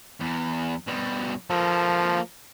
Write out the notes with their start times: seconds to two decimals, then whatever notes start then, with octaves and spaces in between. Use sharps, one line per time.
0.20 E2
0.87 B2 G3
1.50 F3 A#3 A4